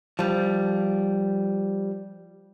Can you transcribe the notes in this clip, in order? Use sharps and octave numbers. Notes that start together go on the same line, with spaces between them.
F3 G3